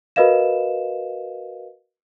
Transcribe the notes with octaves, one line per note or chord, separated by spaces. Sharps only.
F#4 A#4 B4 D#5 F5 E7